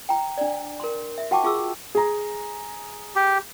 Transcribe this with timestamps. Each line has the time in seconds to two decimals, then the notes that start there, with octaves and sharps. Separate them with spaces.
0.09 G5 A#5
0.38 D4 D5
0.80 A#4 C6
1.18 E5
1.31 F#4 F#5 G5 A5 C#6 D6
1.44 F4 G#4 C#6 D6 E6
1.95 G#4 A#5
3.16 G4